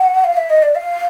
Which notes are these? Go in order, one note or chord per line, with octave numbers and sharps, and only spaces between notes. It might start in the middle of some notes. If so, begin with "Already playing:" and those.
Already playing: F#5
F5
E5
D#5
D5
F5